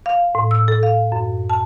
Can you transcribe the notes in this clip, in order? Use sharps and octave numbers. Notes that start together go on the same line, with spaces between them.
F5
A2
E6
A4
F5
F#2
A5